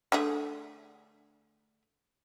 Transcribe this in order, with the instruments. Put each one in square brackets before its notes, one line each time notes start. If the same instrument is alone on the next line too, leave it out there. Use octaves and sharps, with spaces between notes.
[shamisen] D3 A3 G#4